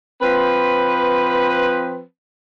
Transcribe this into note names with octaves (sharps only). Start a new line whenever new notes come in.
F3 C4 B4